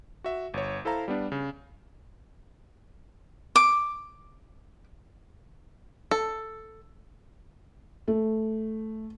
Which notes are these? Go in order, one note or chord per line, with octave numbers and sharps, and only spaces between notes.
F#4 E5
G1 C#5
E4 A4 C5 F5 A#5
G3 B3 D4
C#3
D6
A4
A3